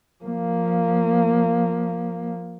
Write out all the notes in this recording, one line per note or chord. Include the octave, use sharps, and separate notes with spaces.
F3 A#3